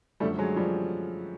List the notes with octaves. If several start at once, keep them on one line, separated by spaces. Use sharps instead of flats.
F#2 D3 F3 G3 A3
F#3 G#3
F3 G3